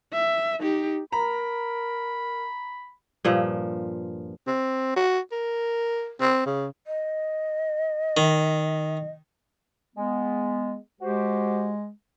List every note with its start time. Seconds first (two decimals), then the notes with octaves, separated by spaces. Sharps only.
0.13 E5
0.60 D#4 G4
1.12 A#4 A#5 B5
3.25 G2 A#2 F3
4.47 C4
4.96 F#4
5.32 A#4
6.21 C4
6.46 C#3
6.87 D#5
8.17 D#3
9.96 G#3 B3
11.01 G#3 F#4 G4 C5